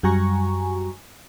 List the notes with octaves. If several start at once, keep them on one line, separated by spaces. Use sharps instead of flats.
F#2 G3 F#4 G#5 A#5 C#6